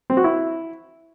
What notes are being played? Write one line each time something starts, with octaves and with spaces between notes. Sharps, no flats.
C4
F#4
E4